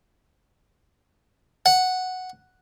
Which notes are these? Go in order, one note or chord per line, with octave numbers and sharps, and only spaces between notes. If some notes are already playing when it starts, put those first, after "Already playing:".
F#5